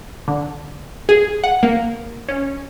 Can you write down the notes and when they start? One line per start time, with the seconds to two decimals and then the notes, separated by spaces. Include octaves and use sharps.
0.28 D3
1.09 G#4
1.44 F#5
1.63 A#3
2.29 C#4